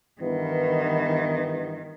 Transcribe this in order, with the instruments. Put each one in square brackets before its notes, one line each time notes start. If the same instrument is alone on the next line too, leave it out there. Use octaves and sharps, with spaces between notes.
[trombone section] G2 E3 B3 [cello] D#3